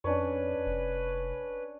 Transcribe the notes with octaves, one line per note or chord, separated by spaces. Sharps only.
F2 C#4 D4 B4 C#5
F1